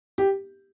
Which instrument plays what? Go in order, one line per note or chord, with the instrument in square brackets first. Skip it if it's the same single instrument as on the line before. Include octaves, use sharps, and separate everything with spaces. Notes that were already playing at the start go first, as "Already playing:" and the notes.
[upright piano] G4